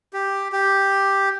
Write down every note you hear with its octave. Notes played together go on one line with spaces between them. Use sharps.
G4
G4